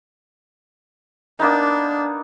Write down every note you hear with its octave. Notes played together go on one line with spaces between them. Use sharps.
A#3 B3 D4 D#4